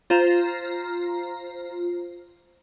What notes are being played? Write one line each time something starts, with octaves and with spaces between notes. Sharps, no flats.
F4 C5 A#5